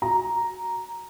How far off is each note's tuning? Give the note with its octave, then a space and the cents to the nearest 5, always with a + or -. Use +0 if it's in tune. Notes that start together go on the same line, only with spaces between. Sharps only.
F#4 +0 A#5 +0